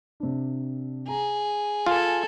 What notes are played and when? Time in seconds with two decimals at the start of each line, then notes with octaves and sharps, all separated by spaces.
0.20 C3 D4
1.08 G#4 A#5
1.86 F4 A4 G#5